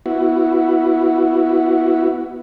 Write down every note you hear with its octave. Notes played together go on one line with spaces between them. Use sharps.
B3 E4 F#4